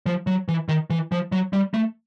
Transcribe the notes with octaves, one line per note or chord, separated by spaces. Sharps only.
F3
F#3
E3
D#3
E3
F3
F#3
G3
A3